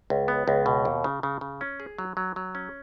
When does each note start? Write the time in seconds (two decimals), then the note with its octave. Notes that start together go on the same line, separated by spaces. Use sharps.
0.10 C#2
0.28 B3
0.48 C#2
0.66 B2
0.85 D#2
1.04 C#3
1.23 C#3
1.41 C#3
1.61 C#4
1.80 G#4
1.98 F#3
2.17 F#3
2.36 F#3
2.55 C#4